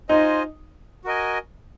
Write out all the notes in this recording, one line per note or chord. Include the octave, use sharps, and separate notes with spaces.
D#4 F4 C5 D#5 G#5
F#4 A#4 D#5 G#5